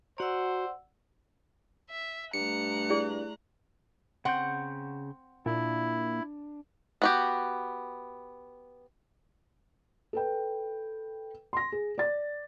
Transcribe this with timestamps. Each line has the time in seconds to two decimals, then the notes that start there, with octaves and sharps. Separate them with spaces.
0.18 F#4 C5 D5 F#5 A#5 E6
1.90 E5
2.33 G2 A3 A#5 F#6 C#7
2.90 E4 G#4 D5
4.25 C#3 C4 F#5 C#6 G6
5.46 A#2 D4 E4
7.02 B3 F#4 G4
10.13 A4 B4 G5
11.53 C6 A#6
11.72 G#4
11.98 D5 A6